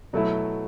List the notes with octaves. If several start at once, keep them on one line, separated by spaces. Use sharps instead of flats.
B2 F#3 A3 E4